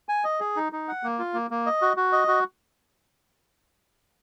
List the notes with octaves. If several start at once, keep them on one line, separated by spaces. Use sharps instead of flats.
G#5
D#5
G#4
D#4
D#4
F#5
A#3
F4
A#3
A#3
D#5
F#4
F#4
D#5
F#4